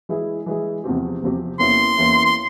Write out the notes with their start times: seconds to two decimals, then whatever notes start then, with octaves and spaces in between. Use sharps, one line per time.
0.09 E3 G#3 E4 G#4
0.46 E3 G#3 E4 G#4
0.84 E2 C3 F3 C4 G4
1.22 E2 C3 F3 C4 G4
1.59 E2 E3 A#3 C#4 E4 C6
1.97 E2 E3 A#3 C#4 E4
2.25 C6